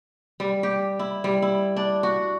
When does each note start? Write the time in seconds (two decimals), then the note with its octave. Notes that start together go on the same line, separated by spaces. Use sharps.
0.40 G3
0.63 G4
0.99 E4
1.24 G3
1.42 E4
1.76 D4
2.03 F#4